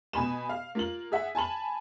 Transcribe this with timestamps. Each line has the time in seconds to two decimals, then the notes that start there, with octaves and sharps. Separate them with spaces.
0.13 B2 G#5 B5 E7
0.49 F5
0.75 A#3 F4 F#7
1.12 G#4 E5 F#5
1.35 G#5 A5 B5 F#7